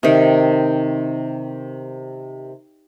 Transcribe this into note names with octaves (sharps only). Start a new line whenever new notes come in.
C3 D#3